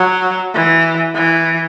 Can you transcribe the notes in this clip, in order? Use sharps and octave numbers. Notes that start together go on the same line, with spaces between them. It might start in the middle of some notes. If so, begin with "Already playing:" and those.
Already playing: F#3
E3
E3